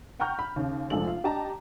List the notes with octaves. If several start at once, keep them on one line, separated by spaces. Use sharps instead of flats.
F#5 G5 A#5 C#6 F6 G6
B5
D#2 C#3
F1 A#1 F3 G#3 A4 F#7
F4 F5
D4 G4 D#5 A5 A#5